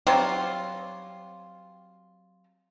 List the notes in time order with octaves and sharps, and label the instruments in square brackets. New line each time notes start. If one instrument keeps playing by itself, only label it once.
[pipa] F#3 G3 C4 F4